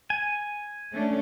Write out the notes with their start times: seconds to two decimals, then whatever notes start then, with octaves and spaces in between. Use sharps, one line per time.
0.10 G#5
0.91 A3 C#4 D4